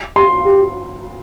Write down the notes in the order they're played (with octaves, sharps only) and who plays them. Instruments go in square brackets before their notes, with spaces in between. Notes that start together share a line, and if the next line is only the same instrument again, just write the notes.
[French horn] G4 [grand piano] C6
[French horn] G4